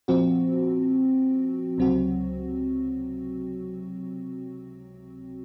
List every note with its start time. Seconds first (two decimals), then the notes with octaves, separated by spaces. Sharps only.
0.08 A#2 F3 C4 F#4
1.78 C#2 C3 F#3 C4 F#4